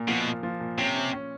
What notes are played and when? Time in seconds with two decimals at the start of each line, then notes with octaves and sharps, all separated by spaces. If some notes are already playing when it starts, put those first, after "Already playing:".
Already playing: A#2
0.08 B2 F3
0.26 A#2
0.43 F3
0.60 A#2
0.78 C3 C#4
0.96 C#4
1.13 C#4